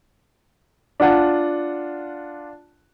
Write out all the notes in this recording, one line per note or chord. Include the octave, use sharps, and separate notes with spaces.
D4 F4 F#5 A5